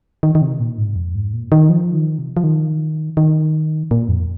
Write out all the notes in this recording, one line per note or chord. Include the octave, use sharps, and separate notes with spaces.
D#3
D#3
C3
A#2
G#2
F2
G#2
A#2
D#3
F3
D#3
C3
F3
D#3
D#3
A#2
F2